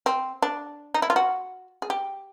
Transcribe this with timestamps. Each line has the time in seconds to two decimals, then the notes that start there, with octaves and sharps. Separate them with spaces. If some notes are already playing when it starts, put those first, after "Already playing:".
0.06 C4
0.42 D4
0.94 D#4
1.02 E4
1.10 F4
1.16 F#4
1.82 G#4
1.90 G4